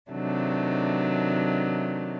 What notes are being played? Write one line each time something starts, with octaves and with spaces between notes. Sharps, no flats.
C3 D#3 F#3 A3 D4